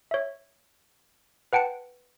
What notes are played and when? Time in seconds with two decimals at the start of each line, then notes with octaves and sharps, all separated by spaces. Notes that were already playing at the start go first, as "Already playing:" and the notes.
0.11 C#5 E5
1.53 B4 F#5 G5 A5 C#7